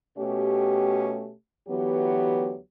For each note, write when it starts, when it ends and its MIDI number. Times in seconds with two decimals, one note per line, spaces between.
0.18 1.32 47
0.18 1.32 57
0.18 1.32 61
0.18 1.32 67
1.68 2.58 38
1.68 2.58 52
1.68 2.58 54
1.68 2.58 59
1.68 2.58 67